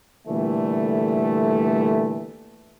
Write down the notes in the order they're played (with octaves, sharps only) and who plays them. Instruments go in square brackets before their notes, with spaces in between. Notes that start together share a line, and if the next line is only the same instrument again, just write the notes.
[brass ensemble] A#2 D3 E3 G3 A3